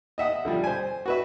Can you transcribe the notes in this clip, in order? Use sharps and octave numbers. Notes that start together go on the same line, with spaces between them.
D#5 E5 F#5 D#6
D3 F3 G3
C5 G#5
F#4 B4 E5